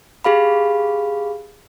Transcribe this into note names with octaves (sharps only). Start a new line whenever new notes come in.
G4 G#4 F5 B5